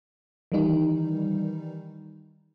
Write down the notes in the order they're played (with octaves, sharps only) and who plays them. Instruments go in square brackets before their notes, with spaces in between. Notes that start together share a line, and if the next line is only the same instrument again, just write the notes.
[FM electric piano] D#3 E3 G3 D#4